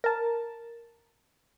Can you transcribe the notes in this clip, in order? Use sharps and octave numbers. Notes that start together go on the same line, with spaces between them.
A#4 A5